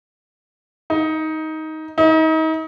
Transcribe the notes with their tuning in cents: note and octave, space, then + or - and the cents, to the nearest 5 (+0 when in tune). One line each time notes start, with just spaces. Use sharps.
D#4 +15
D#4 +35